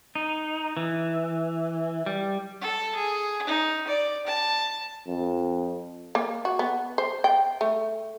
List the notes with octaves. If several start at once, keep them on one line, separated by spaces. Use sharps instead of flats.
D#4
E3
G3
A4
G#4
D#4
D5
A5
F2
A#3
F#4
B3
C5
G5
A3